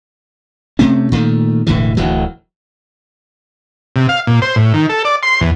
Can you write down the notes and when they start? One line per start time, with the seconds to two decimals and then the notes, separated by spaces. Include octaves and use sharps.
0.79 C3 A3 C4 C#4
1.12 A#2 D#3 A3
1.67 E1 A2 D3 E3
1.97 D1 D2 E3 F#3
3.96 C3
4.09 F5
4.27 A#2
4.42 C5
4.56 A2
4.74 D#3
4.89 A4
5.05 D5
5.23 C6
5.41 E2